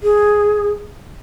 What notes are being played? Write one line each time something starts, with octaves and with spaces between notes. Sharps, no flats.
G#4